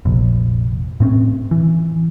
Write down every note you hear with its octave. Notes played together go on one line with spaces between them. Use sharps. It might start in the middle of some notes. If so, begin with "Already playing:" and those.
F1 A#1
A2 C4 C#4
E3